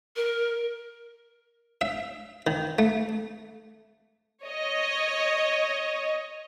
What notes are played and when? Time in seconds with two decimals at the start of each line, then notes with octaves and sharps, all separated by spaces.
0.16 A#4
1.81 E5
2.47 D#3
2.79 A3
4.45 C#5 D#5